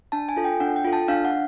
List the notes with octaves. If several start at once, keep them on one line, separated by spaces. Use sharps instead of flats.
D4 A5
G#5
F4 A4
G5
D4 F#5
G5
F4 A4
A5
D4 F5
F#5